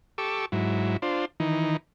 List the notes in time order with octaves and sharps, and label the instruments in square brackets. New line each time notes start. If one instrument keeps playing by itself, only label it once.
[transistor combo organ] G4 A4 C#6 D6 E6
G#2 F#3 E4
D4 F4 C5
D#3 E3 D#4